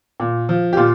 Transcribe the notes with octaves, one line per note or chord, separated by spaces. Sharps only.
A#2
F3
G4
A#2 F4